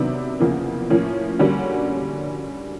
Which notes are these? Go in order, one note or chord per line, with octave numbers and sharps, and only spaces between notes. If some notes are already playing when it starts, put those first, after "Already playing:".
Already playing: C3 D#3 F#3 B3 D4
E2 C#3 F3 A#3
A2 F3 A#3 C#4
D3 G3 A#3 C#4 F#4